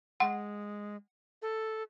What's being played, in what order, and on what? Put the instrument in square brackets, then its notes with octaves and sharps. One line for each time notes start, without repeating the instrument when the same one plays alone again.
[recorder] G#3 [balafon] F#5
[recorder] A4